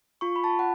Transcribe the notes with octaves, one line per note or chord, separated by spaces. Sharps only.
F4 C#6
B5
A5
F#5